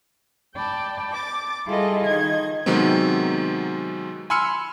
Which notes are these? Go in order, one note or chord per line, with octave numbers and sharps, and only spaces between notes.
D5 G5 A5 B5
D6 A6
G3 E4 F4 G#4 A4 D#5
D#3 D#5 G#6
C3 D#3 F#3 G#3 B3 C4
G#5 B5 C6 E6 F6 C#7